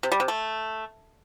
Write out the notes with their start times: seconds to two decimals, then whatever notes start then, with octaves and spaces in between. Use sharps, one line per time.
0.03 C3
0.12 G3
0.20 C3
0.28 A3